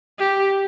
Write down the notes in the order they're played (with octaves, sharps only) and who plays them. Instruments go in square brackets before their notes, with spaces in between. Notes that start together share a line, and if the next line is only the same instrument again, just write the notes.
[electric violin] G4